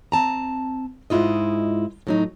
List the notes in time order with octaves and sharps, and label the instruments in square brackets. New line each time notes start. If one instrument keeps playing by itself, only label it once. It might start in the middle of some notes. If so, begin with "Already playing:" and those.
[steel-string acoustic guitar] C4 A5 A#5
G#2 G#3 E4 F4 D#5
A2 F#3 D#4